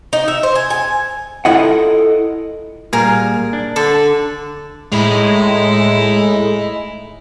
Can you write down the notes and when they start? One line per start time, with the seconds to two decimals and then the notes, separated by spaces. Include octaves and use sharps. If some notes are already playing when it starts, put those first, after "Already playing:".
0.13 D#4
0.28 E5
0.43 C5
0.55 G#5
0.70 G#5
1.45 E4 F4 A4 A#4 D#5 F#5
2.93 A#2 G3 A#3 G#4 A#4
3.53 D4
3.76 D3 A4 D5
4.92 A2 G#3 D#4 E4